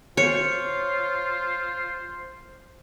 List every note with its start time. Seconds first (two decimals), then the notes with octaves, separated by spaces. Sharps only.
0.17 F4 C5 C#5